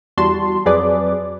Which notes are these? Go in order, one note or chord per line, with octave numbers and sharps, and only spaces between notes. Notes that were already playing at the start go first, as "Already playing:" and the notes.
E2 G3 F#4 A5 C6
F2 F#3 G#4 B4 D5 D6